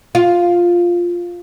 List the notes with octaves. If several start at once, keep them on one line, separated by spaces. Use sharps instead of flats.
F4